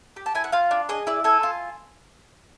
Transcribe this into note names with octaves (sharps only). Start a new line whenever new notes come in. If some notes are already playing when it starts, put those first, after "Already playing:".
G4
A5
E4 G#5
F#5
F4 F5
D4
G#4 D#5
E4 D5
A4 G#5
F4